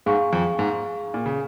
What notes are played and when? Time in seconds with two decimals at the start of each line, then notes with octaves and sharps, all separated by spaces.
0.06 G#2 G#4 F5 G#5 C#6
0.33 F2
0.59 G#2
1.14 A#2
1.26 C#3